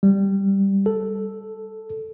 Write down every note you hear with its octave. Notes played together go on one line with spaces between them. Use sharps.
G3
A4